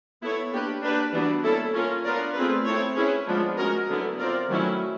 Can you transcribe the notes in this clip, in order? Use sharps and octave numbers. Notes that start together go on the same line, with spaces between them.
B3 E4 A4 C#5
A#3 D4 G4 B4
A#3 D4 G4 B4 D5
E3 G3 B3 D4 F#4
A#3 C#4 E4 A4
C#4 F4 A#4
B3 D4 F4 A#4 D5
A3 C4 F4 G#4 B4
C4 E4 A4 C#5
C#4 E4 G#4 B4
F3 G#3 B3 D4 F4
G#3 C#4 F#4 A#4
D3 F#3 B3 E4
C4 F4 A#4 D5
D#3 F#3 A3 C#4 E4